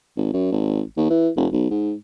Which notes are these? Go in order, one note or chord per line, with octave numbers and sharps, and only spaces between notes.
G#1
F#2
G#1
D#2
E3
F1
B1
G#2